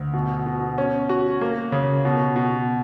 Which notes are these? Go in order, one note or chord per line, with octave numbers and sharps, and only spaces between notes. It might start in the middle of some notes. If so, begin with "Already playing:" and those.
Already playing: D2
B2
B2
C#4
F#4
A#3
C#3
B2
B2